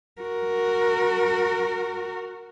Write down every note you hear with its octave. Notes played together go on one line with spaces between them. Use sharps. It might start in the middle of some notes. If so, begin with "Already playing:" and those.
F#4 A#4